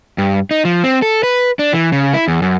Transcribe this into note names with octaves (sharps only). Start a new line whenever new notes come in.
G2
D#4
F3
C4
A4
B4
D4
E3
C#3
E4
E2
F#2